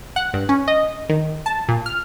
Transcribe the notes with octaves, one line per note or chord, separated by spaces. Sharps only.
F#5
G2
C#4
D#5
D#3
A5
A#2
F6